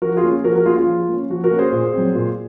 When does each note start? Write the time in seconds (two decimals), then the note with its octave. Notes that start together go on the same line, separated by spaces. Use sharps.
0.02 F3 F#4 A#4
0.17 F4 G#4
0.23 A#3 C#4
0.44 F3 F#4 A#4
0.55 F#4 A#4
0.66 A#3 C#4 F4 G#4
0.76 F4
0.87 F3
1.09 A#3 C#4
1.30 F3 F#4
1.44 F#4 A#4
1.51 A#3 C#4
1.59 G#4 C5
1.72 A#2
1.94 F#3 C4
2.15 A#2